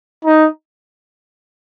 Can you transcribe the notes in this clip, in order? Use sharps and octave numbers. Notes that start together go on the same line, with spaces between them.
D#4